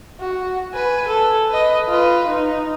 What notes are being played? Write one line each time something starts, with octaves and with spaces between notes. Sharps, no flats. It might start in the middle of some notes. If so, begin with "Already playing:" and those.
F#4
B4 G#5
A4
B4 D#5
F4 B4
D#4